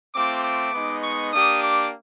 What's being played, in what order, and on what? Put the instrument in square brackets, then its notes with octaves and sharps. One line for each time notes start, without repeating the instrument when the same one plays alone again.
[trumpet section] A3 C4 F4 D6
D6
G#3 B3 D#4
C#6
A#3 D4 G4 D#6
D6